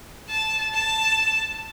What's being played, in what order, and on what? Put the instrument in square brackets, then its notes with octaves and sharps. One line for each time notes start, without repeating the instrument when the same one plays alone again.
[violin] A5
A5